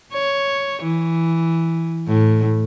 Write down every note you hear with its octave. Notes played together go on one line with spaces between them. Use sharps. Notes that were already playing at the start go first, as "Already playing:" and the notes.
C#5
E3
A2